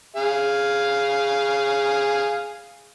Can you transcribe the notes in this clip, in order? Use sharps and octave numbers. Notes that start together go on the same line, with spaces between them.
G#4 F5